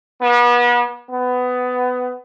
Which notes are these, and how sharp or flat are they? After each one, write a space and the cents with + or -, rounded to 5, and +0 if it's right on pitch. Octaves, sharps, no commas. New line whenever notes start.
B3 -35
B3 +20